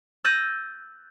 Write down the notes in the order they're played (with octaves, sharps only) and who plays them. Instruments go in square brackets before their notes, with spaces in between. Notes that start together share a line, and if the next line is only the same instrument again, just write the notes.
[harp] E6 F#6 G6 A6 A#6 D#7